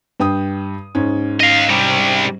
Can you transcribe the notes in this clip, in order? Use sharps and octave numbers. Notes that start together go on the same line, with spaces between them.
G2 G5 D#6
G#2 C#4
D#5 F5
C3 G3